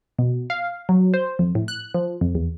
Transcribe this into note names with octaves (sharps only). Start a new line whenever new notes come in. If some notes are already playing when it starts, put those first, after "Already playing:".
B2
F5
F#3
C5
F2
A2
F#6
F3
F2
E2